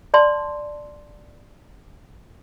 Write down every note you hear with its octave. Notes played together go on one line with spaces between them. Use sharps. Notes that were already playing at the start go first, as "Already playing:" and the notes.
D5 A5 C6